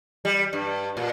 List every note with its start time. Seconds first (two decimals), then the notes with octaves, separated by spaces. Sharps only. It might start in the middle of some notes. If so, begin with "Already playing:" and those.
0.25 G3
0.53 G2
0.97 A#2